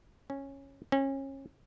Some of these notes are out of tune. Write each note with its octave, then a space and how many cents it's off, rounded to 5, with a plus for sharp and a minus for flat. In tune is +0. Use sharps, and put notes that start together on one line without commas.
C#4 -10
C#4 -30